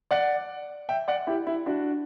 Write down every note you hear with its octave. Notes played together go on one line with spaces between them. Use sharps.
D5 F#5
E5 G5
D5 F#5
E4 G4
E4
D4 F#4